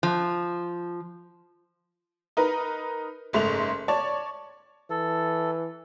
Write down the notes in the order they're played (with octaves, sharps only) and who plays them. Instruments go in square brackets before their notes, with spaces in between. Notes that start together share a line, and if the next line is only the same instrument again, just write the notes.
[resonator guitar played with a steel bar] F3
[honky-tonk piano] D#4 A#4 B4
F#1 G#2 A3 F7
C#5 D5 A5 C#6
[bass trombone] E3 [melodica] A4